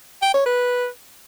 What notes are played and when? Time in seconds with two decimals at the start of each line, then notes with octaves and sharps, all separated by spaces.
0.22 G5
0.34 C#5
0.46 B4